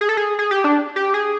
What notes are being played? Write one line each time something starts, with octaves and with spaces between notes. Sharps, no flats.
G#4
A4
G#4
G#4
G4
D4
G4
G#4